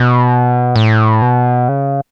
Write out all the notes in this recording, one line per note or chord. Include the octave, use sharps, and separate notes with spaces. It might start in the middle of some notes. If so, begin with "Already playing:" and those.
Already playing: B2
A2
B2
C#3